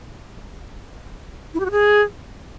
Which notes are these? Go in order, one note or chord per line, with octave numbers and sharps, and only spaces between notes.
E4
G4
F#4
G#4